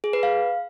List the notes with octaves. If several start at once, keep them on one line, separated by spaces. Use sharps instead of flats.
G#4
B4
F5